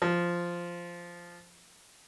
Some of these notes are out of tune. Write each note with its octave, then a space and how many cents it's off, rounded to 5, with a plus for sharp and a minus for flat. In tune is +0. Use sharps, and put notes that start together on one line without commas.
F3 -5